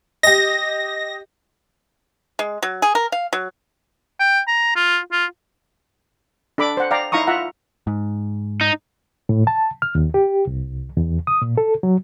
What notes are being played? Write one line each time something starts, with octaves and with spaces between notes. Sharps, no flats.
G4 D#5 A#6
G#3
F#3
G#4
A#4
F5
F#3
G5
A#5
F4
F4
D4 A4 B5 D6
C5 F#5
D5 F5 G5 A#5
D#4 E4 F5 A#5 C#6 D#6
F4 E5 F#5 A#5
G#2
D#4
A2
A5
F6
D#2
G4
C2
E2
D#6
A#2
A4
F#3